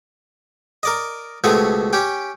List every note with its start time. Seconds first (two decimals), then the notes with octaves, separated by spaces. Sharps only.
0.83 A#4 D5 D#5
1.44 C#2 B2 A3 C4 C#5 D#6
1.93 C#4 G4 G5